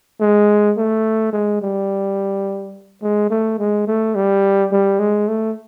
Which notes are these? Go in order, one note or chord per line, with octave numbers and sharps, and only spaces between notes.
G#3
A3
G#3
G3
G#3
A3
G#3
A3
G3
G3
G#3
A3